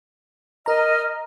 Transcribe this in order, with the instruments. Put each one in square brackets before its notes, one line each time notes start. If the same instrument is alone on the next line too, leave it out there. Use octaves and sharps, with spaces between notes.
[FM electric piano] A#4 A#5 [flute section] D#5 F6